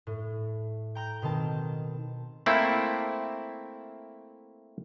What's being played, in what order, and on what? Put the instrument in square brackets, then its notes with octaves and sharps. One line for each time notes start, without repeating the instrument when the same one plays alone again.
[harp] A2
G5 A#5 G6
B2 D#3 C4 A5
[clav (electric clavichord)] A3 A#3 C4 E4